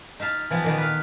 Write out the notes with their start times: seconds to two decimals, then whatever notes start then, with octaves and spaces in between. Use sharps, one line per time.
0.20 D#4 E5 F5 A5
0.50 E3 F3 B3 G4
0.64 A#2 D#3 B3
0.78 B4 F5